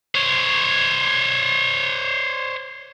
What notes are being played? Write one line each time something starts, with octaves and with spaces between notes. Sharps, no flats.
C5 C#5